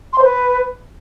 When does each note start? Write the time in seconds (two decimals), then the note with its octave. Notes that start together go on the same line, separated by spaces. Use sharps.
0.13 C6
0.18 C5
0.23 B4